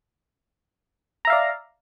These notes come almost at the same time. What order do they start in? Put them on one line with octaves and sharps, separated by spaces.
A#5 E5 F5 D5